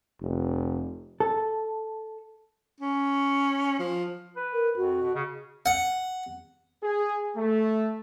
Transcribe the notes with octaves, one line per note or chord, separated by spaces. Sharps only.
F1
A4
C#4
F3
B4
A#4
F2 F#4
B2
C#3
F#5
G#4
A3